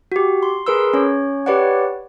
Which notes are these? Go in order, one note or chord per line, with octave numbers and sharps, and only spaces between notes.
F#4 G4
C6
G#4 A#4 B4 C6 E6
C#4 C#5
G4 B4 C#5 D5 F#5